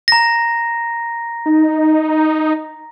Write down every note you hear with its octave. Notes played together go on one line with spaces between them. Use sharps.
A#5 A#6
D#4